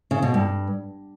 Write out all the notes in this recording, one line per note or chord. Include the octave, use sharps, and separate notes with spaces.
C#3
B2
G2